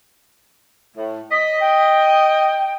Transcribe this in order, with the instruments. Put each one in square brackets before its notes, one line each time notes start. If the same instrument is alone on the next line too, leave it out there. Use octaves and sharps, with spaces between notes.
[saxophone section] A2
[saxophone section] D#5 [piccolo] B6
[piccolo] G5